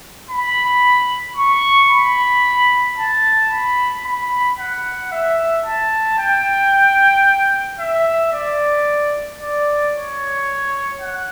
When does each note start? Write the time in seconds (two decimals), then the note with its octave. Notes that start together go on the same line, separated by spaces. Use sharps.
0.30 B5
1.37 C#6
1.90 B5
2.98 A5
3.52 B5
4.05 B5
4.59 F#5
5.12 E5
5.66 A5
6.19 G5
7.80 E5
8.33 D5
9.41 D5
9.95 C#5
11.01 F#5